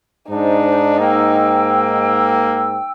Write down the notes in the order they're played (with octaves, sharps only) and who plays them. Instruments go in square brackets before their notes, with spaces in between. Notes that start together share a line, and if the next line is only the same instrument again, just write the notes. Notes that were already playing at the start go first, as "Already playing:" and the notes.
[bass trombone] G#2 [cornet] D4 [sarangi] D#4 [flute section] C5
[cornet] A#3 [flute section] G5 E6